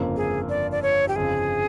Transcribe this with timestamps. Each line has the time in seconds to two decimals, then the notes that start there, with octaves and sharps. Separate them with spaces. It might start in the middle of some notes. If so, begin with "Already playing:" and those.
Already playing: G1 F2 C#3 F3 A#3
0.16 G#4
0.49 D5
0.71 D5
0.82 C#5
1.08 G4
1.16 G1 F2 C#3 G#4